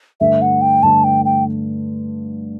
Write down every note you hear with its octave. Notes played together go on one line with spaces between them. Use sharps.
G2 D3 A3 E5
F#5
G5
G2 D3 A3 A5
G5
G5